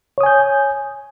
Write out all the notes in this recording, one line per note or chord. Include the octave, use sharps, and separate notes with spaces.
C#5 G#5 D#6 G6